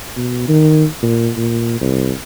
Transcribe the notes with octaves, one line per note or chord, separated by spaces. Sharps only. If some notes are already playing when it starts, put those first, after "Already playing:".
B2
D#3
A#2
A#2
C2